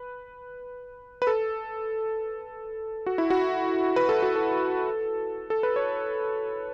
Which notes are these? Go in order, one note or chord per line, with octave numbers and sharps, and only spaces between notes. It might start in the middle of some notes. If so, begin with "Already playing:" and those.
Already playing: B4
B4
A4
F#4
E4
F#4
B4
A4
F#4
A4
A4
B4
C#5